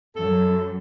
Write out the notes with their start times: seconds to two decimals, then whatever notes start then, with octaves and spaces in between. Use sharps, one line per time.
0.16 F#2 A4